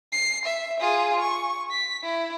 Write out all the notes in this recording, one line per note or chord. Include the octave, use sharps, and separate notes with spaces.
C7
E5
F4 G#4
C#6
B6
E4